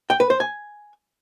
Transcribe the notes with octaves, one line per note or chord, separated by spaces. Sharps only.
G5
B4
C5
G#5